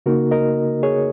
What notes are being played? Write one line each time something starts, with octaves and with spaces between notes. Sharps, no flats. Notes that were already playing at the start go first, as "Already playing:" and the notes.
C#3 A#3 D#4 F#4 A#4
A#4 D#5
G#4 C#5